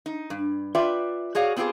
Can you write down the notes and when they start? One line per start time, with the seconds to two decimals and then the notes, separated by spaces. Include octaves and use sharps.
0.06 D#4
0.30 G2
0.75 F4 B4 D5 E5 G5
1.35 F#4 G#4 C#5 D5 F5
1.57 B3 C4 F4 G4 G#4 C5